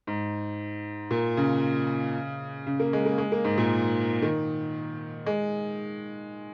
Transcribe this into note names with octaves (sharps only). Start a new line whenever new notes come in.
G#2
A#2
C#3
C#3
A#3
G#3
A#3
G#3
A#3
G#2
A#2
D#3
G#3